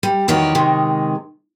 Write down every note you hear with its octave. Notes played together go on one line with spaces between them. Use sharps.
G3
E2 D#3 F3 F#4 C#5 D5
C3 D#3 G#3